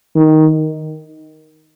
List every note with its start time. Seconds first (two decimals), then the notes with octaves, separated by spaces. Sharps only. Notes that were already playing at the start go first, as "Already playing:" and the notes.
0.16 D#3